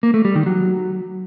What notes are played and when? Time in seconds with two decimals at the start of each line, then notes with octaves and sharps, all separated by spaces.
0.03 A#3
0.14 A3
0.25 G3
0.35 D#3
0.46 F#3